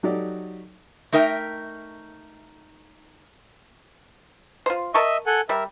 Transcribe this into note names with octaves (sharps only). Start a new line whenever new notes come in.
F#3 D#4 F#4 G4 A4 D5
A3 D#4 A#4 E5 G5
F4 C5
A#4 D#5 E5 A5 C#6
A4 F#5 G#5
G3 A#4 E5